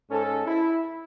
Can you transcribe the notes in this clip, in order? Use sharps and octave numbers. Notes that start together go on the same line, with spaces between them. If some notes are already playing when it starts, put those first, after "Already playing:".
G#2 C#4 A4
E4